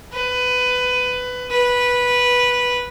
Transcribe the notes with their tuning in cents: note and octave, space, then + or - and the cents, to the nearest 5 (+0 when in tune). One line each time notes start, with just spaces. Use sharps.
B4 +15
B4 -10